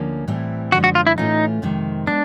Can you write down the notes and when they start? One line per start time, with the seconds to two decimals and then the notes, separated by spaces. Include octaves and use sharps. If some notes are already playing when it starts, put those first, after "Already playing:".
Already playing: D2 D3 F3 A#3 C#4
0.28 A2 E3 G3 C4 E4
0.72 F#2 D3 F3 G#3 F#4
0.84 F#4
0.95 F4
1.07 E4
1.18 A2 E3 A3 C#4 D#4 F4
1.62 F2 C3 D#3 G#3
2.07 G#3 B3 D4